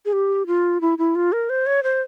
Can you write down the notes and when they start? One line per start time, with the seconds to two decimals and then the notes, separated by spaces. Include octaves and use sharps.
0.05 G#4
0.13 G4
0.47 F4
0.81 E4
0.98 E4
1.15 F4
1.32 A#4
1.50 C5
1.66 C#5
1.83 C5